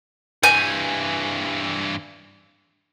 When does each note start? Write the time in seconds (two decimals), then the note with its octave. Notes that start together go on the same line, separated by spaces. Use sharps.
0.43 G2 E3 G#5 G6